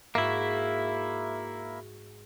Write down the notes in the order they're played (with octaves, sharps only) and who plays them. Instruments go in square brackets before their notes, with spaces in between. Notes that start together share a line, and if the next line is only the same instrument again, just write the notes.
[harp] G#2 F#4 [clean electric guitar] A#3 E4 [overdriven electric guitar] E5